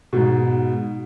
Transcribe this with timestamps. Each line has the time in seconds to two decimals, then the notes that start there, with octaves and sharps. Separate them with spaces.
0.13 G#2 B2